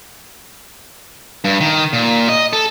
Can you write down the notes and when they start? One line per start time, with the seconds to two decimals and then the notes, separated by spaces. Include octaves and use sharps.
1.44 G2
1.61 D#3
1.93 A#2
2.29 D#5
2.53 A4